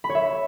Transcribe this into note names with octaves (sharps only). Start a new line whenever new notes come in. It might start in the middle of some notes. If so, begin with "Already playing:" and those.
B5
C#5
E5